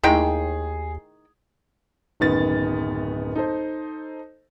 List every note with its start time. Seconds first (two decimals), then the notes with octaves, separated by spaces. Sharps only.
0.04 D#2 D#3 A3 D#4 E4 G#4 G5
2.20 D1 F#2 D#3 B3 A6
3.36 D#4 A4 C5